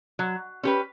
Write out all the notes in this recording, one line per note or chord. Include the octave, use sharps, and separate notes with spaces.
F#3
C#4 G4 B4